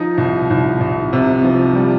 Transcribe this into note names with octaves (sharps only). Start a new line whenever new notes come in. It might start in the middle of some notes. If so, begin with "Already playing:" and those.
Already playing: F3 D#4
C2
C2
C2
C3
F3
G3